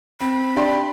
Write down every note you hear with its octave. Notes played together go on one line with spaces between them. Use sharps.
C4 B5
D4 G4 D5 C6